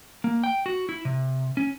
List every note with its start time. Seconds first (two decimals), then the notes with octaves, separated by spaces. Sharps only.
0.24 A#3
0.44 G5
0.66 F#4
0.89 E4
1.05 C3
1.57 C#4